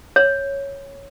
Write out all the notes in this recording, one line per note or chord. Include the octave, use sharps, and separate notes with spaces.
C#5